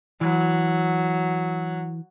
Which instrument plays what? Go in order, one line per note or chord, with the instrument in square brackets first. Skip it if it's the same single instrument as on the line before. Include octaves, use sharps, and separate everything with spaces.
[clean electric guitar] E3 [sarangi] F#3